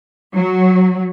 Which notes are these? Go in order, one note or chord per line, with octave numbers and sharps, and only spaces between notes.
F#3